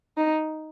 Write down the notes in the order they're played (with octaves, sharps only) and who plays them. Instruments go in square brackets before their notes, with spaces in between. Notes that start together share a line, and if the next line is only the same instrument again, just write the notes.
[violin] D#4